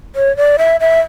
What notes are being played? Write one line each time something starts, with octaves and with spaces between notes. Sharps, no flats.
C#5
D5
E5
E5